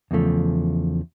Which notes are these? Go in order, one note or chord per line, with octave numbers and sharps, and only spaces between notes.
E2 C#3 F3 A3